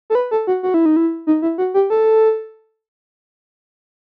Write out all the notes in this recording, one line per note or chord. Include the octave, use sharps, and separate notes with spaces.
A4
B4
A4
F#4
F#4
E4
D#4
E4
D#4
E4
F#4
G4
A4